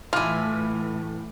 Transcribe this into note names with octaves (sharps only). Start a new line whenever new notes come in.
A2 E3 A3 E4 F4 G#5 D6 F6